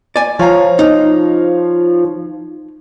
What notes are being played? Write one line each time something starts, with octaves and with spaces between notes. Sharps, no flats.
D5 G#5
F3 C#5 F5 A#5
D#4